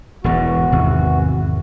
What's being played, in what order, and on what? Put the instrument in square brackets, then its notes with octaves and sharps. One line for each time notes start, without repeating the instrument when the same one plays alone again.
[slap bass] E1 E2 G#2 [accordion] E3 F#4
[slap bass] G#1 [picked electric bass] E2 C3